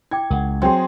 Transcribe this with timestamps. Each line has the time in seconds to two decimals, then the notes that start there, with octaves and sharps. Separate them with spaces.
0.11 E4 G5 D6 G#6
0.30 C#2 A#4 F#5
0.62 F#3 C4 G#4 G5 C6